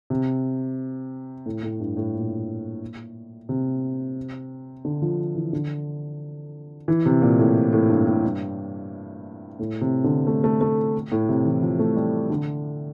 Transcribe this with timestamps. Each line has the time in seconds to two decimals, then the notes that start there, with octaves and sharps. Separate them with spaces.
0.10 C3
1.46 A2
1.63 A2
1.80 G2
1.97 A2
2.14 A#2
3.49 C3
4.85 D3
5.02 F3
5.35 E3
5.53 D3
6.88 E3
7.06 C3
7.22 A#2
7.39 A2
7.73 A2
7.90 G2
8.07 A2
8.24 G2
9.59 A2
9.81 C3
10.04 D3
10.27 A3
10.44 A3
10.61 A3
11.12 A2
11.29 C3
11.45 E3
11.62 F3
11.79 A3
11.96 G3
12.30 D3